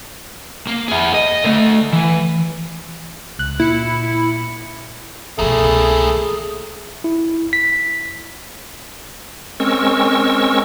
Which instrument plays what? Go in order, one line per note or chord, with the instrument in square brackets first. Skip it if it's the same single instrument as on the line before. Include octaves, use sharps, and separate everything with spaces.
[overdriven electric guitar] A#3
E4 G#4
D#5
D3 A3
E3
[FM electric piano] C#2 F#6
[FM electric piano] A#2 C#7 [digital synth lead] E4
[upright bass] C2 B2 [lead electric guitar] E3 A#3 [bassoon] A3 [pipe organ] G#4
[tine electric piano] E4
B6
[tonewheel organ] G#3 C4 C#4 A#4 C#6 E6